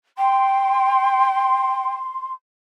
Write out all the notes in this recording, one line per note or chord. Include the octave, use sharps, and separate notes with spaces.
G5 C6